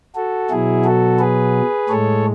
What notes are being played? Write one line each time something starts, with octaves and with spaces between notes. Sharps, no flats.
F#4 A4
B2 F#3 E4 G#4
F#4 A4
G#4 B4
A2 G#3 A4 C#5